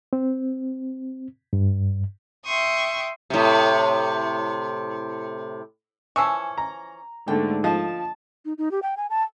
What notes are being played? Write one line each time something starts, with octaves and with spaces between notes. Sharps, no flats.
C4
G2
E5 G5 C6 C#6 D#6
A2 C3
E3 F3 C#4 C#6 E6
A#5
G#2 D3 A3 A#3 G5
F3 D#5 A5
D#4
D#4
G4
G5
G#5
A5